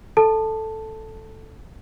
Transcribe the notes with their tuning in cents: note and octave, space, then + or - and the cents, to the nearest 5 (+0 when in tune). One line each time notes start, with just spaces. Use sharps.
A4 +0 A5 +0